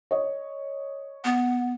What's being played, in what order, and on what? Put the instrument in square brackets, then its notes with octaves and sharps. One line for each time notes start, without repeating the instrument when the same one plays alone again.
[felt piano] C#5 D#5
[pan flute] B3 [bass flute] F#5